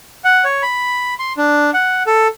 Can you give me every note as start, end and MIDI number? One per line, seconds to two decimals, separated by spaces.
0.24 0.44 78
0.44 0.62 73
0.62 1.14 83
1.19 1.33 84
1.37 1.71 62
1.74 2.03 78
2.07 2.28 69